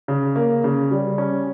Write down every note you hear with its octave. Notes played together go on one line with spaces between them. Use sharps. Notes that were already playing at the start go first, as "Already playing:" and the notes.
C#3
A#3
C#3
G3
C#4